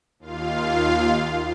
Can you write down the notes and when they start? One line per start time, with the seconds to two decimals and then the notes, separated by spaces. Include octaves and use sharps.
0.19 D#2 F4 F5